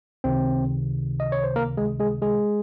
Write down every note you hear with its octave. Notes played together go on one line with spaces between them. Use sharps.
C#2 C3 D#3 C4
D#5
C#5
C5
A#3 A#4
G#3 G#4
G#3 G#4
G#3 G#4